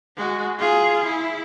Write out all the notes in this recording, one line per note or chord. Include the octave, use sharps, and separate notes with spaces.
G#3 F#4
F4 G#4
E4